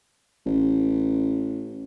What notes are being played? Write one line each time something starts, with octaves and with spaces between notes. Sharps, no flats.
A1